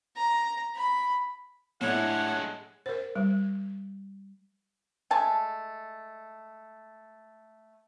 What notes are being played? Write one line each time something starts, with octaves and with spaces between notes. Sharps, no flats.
A#5
B5
A2 G#3 D4 E4 A4 C#5 F#5
A#4 C5
G3
G#3 A3 G#5 A5